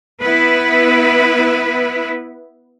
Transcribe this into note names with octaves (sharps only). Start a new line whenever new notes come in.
B3 E4 B4